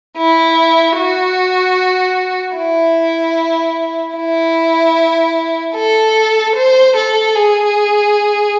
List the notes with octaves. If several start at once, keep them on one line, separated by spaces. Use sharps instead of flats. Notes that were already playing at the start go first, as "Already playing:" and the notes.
E4
F#4
E4
E4
A4
C5
A4
G#4